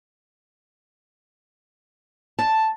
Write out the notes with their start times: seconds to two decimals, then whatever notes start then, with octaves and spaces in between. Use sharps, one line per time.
2.39 A5